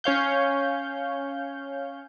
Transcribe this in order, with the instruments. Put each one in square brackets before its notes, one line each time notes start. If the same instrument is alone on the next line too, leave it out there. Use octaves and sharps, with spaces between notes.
[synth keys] C#4 C#5 F5 G6